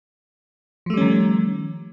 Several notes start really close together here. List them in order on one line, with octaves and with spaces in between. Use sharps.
F3 A3 G3 C#4 D#3